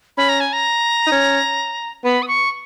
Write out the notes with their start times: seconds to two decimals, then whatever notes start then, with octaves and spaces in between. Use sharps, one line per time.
0.17 C#4 B5
0.29 A#5
0.40 G#5
0.53 A#5
1.07 D#4
1.12 C#4
2.04 B3 B5
2.22 D#6
2.28 C#6